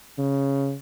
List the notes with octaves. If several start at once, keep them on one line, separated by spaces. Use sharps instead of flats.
C#3